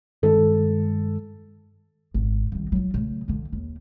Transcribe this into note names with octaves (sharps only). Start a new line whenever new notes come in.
G2 D#3 G#3 A4
G#1
C2 D#3
F#3 F4
C#3 A3
D3 E3
D#2